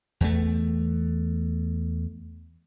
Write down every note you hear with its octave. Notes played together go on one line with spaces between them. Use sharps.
E2 A3